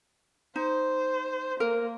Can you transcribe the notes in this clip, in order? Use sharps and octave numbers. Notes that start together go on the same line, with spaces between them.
D#4 C5
A#3 A#4